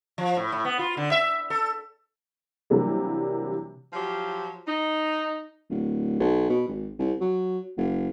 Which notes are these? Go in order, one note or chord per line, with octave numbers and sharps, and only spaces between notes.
F3
A2
A2
B3
F4
D3
E5
A4
C3 E3 F#3 G3 A#3 D4
F3 F#3 F4 G4
D#4
D1
B1
B2
G#1
C2
F#3
F#1